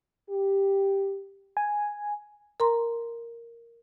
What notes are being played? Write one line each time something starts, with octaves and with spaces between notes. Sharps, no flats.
G4
G#5
A#4 A#5 C6